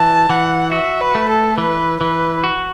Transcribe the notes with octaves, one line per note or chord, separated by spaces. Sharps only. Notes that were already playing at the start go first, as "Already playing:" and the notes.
Already playing: E3 A5
E3 F#5
F#4 E5
B4
A3
A4
E3 B4
E3 B4
F#4